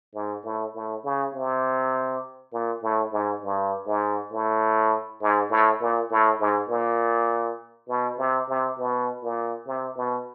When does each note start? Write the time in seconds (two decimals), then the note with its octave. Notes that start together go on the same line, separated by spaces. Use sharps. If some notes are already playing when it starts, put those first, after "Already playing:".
0.15 G#2
0.44 A2
0.75 A2
1.04 C#3
1.34 C3
2.53 A#2
2.83 A2
3.12 G#2
3.42 G2
3.87 G#2
4.32 A2
5.21 G#2
5.50 A2
5.81 A#2
6.11 A2
6.40 G#2
6.69 A#2
7.88 B2
8.18 C3
8.49 C3
8.78 B2
9.23 A#2
9.67 C3
9.96 B2